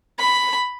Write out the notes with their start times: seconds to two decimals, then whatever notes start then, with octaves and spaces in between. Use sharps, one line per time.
0.19 B5